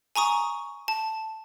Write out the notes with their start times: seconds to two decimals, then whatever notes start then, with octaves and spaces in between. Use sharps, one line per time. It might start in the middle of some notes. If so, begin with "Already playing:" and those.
0.16 G#5 A#5 C#6 D#6
0.88 A5